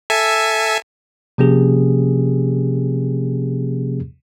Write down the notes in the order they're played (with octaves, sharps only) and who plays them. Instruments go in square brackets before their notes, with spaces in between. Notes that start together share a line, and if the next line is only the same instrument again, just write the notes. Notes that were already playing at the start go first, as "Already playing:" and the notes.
[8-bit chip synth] A4 E5 G#5
[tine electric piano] C3 F3 A#3 C#4 G4 G#4